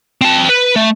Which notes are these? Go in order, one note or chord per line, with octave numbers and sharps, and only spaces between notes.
C4 A5
B4
A3